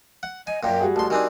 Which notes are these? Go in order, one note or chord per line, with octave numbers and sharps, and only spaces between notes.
F#5
D#5 G#5
F#2 A#2 G5
G3 F#4 G#4
A1 A5 C6
D#3 C4 D4 G#5